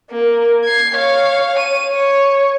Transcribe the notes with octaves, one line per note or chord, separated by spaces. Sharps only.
A#3
G#6 C7
C#5 F5
D#7
C#5